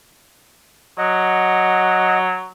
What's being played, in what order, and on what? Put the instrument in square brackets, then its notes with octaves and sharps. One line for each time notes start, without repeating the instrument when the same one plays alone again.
[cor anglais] F#3 [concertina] D#5 F#5